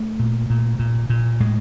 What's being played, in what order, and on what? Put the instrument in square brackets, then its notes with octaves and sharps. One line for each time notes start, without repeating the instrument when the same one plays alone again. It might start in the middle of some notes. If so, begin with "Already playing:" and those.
Already playing: [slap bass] A3
A#2
A#2
A#2
A#2
A2 G#3